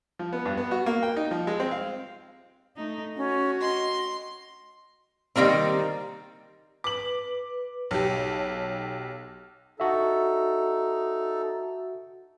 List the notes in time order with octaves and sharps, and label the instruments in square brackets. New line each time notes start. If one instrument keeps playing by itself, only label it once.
[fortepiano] F3
B3
G2
B3
F#4
A#3
G5
D#4
F3
G#3
C4
F5
[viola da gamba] A3 D#4
[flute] C#4 [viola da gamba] F#4
[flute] D#5 [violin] C6
[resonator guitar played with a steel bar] D#3 F#3 G3 A#3 C4
[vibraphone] B4 [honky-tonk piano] D6 F#7
[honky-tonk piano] B1 G4 [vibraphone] C#5 A5
[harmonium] D#4 A4 [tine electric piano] F#4 E5